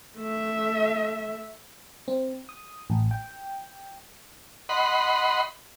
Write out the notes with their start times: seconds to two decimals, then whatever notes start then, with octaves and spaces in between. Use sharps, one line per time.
0.17 A3 E5
2.08 C4
2.49 D#6
2.90 A1
3.11 G5
4.69 D#5 F#5 B5 C6